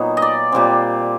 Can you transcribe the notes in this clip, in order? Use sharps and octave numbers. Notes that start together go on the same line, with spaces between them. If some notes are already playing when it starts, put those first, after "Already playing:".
Already playing: A#2 F#3 B3 D#4
D#5
D5
A#2 G3 C4